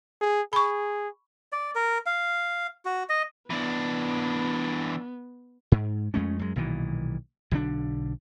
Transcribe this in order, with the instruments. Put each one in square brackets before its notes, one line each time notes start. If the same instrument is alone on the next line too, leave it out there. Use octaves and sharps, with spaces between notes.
[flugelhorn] G#4
[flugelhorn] G#4 [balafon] B5 C#6
[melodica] D5
A#4
F5
F#4
D#5
[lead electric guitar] E3 D4 [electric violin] B3
[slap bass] G#2
F2 G#3 A3 C#4
F#2 G#3
B1 A#2 D#3 E3
B1 D3 D#3 D4